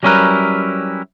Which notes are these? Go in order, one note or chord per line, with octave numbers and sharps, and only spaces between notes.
F#3 G3 C#4 E4 A#4 B4